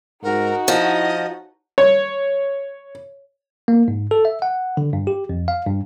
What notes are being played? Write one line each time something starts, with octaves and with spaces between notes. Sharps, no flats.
G#2 D#4 F#4 A#4
F3 E4 D#5
C#5
A#3
G#2
A4
E5
F#5
D3
G2
G4
F2
F5
G2